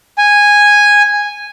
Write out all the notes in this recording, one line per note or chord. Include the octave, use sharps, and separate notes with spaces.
G#5